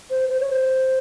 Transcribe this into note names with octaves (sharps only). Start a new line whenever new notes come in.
C5
C5
C#5
C5